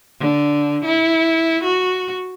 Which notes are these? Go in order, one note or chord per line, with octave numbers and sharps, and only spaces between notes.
D3
E4
F#4